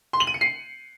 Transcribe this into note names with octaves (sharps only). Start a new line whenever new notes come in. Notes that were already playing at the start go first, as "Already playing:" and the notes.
C6
F#7
D#7
C#7
C7